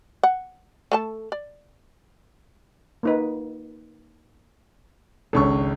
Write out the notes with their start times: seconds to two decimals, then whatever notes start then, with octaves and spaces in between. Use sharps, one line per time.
0.23 F#5
0.92 A3 A4 A5
1.32 D5
3.03 A#3 D#4 B4
5.33 G#1 C#2 C#4 D4 A4 C#6